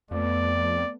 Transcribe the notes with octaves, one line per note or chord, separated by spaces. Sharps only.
F2 A3 B3 D5